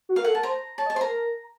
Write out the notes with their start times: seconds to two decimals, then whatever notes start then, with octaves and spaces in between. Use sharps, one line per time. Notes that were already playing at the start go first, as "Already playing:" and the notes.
0.09 F#4
0.16 A#4 F5
0.24 A4 F#5
0.34 A#4 A5
0.43 C5 A#5
0.78 C#5 A5
0.86 D#5
0.90 A5
0.95 C5 C6
1.01 A#4 A#5